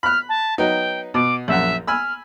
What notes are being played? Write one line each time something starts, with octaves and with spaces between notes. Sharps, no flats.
B5 F6 F#6
A5
F#3 B3 D#4 G5
B2 D6
A#1 F#2 E5 F#5
G#5 B5 E6 F6